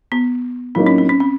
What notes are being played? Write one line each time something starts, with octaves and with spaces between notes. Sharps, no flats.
B3
A2 F#3 A#3 C4 D#4
C#4
C4
C#4
C4